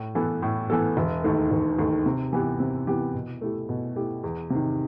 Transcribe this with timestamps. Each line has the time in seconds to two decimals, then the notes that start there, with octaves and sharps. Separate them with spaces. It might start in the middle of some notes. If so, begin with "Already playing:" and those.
Already playing: A2
0.15 E3 B3 E4 A4
0.42 A2
0.70 E3 B3 E4 A4
0.97 E1
1.24 D#2 D#3 A3
1.51 E1
1.78 D#2 D#3 A3
2.06 C3
2.33 E3 B3 E4 G4
2.60 C3
2.87 E3 B3 E4 G4
3.14 B2
3.41 A3 E4 G4
3.69 B2
3.96 A3 E4 G4
4.24 E2
4.50 C3 D#3